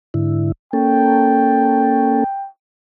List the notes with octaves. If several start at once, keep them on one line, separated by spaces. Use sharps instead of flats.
G#2 D3 E4
A#3 C#4 A4 G5